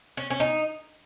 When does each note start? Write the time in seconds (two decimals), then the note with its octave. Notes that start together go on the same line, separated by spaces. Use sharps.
0.17 C#4
0.30 C#4
0.40 D#4